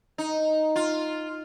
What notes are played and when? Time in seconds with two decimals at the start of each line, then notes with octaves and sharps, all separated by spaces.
0.18 D#4
0.76 F4